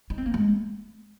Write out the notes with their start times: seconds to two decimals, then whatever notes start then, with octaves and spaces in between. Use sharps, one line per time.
0.10 D#4
0.18 C4
0.26 A#3
0.34 G#3